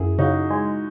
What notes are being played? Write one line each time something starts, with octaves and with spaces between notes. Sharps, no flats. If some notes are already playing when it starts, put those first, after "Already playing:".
Already playing: F#2 E4 G#4
C#3 D#4 F#4
G#3